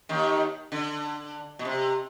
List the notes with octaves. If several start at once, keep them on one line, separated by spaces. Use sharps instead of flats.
D#2 D#3
D3
B2
C3